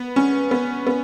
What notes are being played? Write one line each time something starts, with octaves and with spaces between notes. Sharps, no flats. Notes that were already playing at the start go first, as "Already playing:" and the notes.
Already playing: B3
C#4
B3
B3